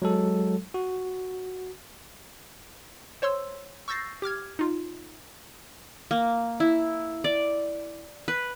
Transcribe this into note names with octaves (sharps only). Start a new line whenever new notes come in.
F#3 G#3 A4
F#4
C5 C#5 C6 E6
C#6 E6 G6 A6 A#6 C7
G4 D6 F6 G#6
D#4 F4
A#3
E4
D5
B4